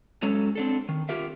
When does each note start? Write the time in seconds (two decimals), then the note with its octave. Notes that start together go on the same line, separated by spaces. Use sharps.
0.22 F#3 G#3 C#4 A4
0.55 C4 D4 A4
0.89 D#3
1.09 F4 G4 A#4 E5